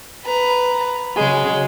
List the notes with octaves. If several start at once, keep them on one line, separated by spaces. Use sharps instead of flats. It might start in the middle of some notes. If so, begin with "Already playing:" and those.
B4 A#5
C#3 F#3 G#3